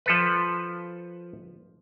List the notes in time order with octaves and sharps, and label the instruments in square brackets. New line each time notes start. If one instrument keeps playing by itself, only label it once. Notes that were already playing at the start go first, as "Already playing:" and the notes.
[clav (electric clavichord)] F3 A4 B4